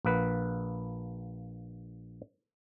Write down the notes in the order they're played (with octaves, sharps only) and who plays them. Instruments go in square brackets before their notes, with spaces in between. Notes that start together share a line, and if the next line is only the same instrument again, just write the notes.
[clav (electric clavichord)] A#1 A#3 B4 F#5